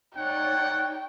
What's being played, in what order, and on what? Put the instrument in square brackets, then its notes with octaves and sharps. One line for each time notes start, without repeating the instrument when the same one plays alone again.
[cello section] D#4 C#5 D5 [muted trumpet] F#5 [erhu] G5